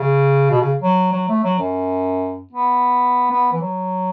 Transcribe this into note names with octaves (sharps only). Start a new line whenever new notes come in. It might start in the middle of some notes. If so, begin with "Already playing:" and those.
Already playing: C#3
B2
C#3
F#3
F#3
A3
F#3
F#2
B3
B3
E3
F#3